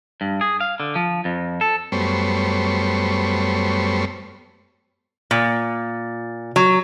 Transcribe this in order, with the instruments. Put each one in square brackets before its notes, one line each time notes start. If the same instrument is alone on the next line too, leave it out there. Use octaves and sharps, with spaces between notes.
[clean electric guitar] G2
G#4
F5
D3
F3
F2
A4
[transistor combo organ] F#2 G3 A3 B3 C5 C#5
[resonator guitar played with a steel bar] A#2
F#3